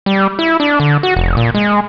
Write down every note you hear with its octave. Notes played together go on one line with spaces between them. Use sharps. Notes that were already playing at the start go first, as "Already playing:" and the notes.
G3
E4
D4
D3
F#4
F1
A#2
G#3